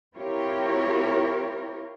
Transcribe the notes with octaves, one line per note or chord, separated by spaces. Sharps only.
C4 E4 F4 G4 A#4 C#5